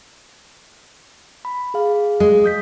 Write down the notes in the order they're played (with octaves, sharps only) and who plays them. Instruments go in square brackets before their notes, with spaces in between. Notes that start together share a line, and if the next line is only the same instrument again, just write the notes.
[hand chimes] B5
G#4 F5
[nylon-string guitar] G#3
[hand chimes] D#6 G6 B6